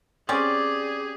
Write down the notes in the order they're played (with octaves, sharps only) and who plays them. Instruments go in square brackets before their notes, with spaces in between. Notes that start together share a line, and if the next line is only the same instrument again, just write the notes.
[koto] C4 C#4 [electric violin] G4 G#4 [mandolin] D5